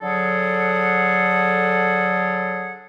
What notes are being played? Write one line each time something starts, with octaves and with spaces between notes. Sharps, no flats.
D3 F#3 G#4 A4 F#5